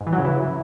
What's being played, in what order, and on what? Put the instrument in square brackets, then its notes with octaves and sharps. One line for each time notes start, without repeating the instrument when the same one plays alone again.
[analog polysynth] G#2
E3
F#3
C#3
E3